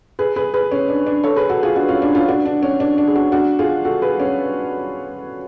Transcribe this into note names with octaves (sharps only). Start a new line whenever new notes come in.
G#4 B4
G#4 B4
G#4 B4
C#4
D4
D4
A4 C#5
G#4 B4
F#4 A4
F4 G#4
D4 F#4
C#4 F4
D4
C#4 F4
D4 F#4
D4
C#4
D4
D4
G#4
D4 F#4
D4 F#4
F4 G#4
F#4 A4
G#4 B4
C#4